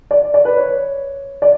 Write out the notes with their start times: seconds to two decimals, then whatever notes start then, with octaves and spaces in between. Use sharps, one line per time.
0.11 D5
0.34 D5
0.45 B4
0.57 C#5
1.42 D5